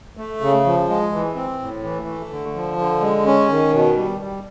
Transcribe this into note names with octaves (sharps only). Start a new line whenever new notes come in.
A3
C#3
F3
G#3
E3
C4
A2
E3
A3
D3
F3
D3
G#3
C#4
D#3
B2
G3
G3